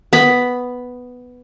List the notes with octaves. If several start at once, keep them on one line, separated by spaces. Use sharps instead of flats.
B3 B5